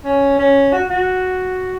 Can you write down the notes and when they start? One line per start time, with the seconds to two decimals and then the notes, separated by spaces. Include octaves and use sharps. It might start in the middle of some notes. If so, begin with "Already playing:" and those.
0.05 C#4
0.39 C#4
0.73 F#4
0.90 F#4